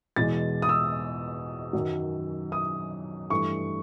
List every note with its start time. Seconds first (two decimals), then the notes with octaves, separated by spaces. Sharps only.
0.16 E2 B2 G#3 A6
0.62 D#6
0.69 E6
1.73 F#2 D#3 F#3
2.52 D#6
3.30 G2 E3 A3 C#6